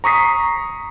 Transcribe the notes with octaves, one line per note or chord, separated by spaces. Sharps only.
A#5 C#6 D#6 B6 C7